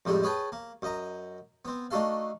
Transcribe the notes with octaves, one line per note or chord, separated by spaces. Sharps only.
F2 A2 G3 G#3 D#4
C#4 G#4 B4 G5 A5
A#3
F#2 D#5 A#5
B3 C4
A3 D4 D#4 F#4 A4 F5